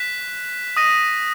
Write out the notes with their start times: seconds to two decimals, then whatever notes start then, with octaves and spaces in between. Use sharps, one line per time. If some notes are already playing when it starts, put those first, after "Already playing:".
Already playing: F#6 B6 E7
0.77 D#6 A#6 D#7